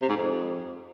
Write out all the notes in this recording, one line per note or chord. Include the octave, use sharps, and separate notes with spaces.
C3
G#2
F2